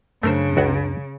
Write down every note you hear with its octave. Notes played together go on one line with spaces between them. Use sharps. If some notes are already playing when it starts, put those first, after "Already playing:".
F#2 C#3 A3 D4 A#4 C5
C#2 F#4 F#5